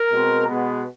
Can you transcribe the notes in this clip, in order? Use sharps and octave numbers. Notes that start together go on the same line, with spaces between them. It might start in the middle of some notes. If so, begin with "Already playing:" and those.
Already playing: A#4
B2 G#3 C4
B2 G#3 B3